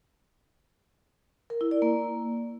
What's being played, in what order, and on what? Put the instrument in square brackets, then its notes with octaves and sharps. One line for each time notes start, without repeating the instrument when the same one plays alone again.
[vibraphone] A#4
E4
D5
A#3